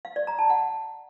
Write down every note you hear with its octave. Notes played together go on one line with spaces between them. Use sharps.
F5
D5
A#5
A5
F#5